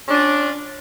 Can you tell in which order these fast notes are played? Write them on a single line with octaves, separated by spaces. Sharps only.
C#4 D4 F4